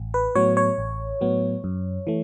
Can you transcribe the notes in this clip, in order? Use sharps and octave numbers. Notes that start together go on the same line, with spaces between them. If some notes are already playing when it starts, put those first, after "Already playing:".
Already playing: A1
B4
A2 F#3 B3 C#5
C#5
A1
A2 F#3 B3
F#2
E3 A3